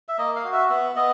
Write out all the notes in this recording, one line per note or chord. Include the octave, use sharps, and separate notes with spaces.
E5
A#3 D#5
F5
F#4
E5
B3 E5
B3 D#5